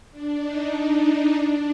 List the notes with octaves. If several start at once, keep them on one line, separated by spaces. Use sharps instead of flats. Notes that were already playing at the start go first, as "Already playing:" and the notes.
D4
D#4
D#4
D4